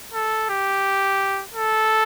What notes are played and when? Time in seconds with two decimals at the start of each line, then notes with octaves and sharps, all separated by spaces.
0.14 A4
0.49 G4
1.54 A4